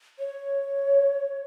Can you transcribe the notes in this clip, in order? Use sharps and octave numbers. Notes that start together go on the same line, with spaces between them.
C#5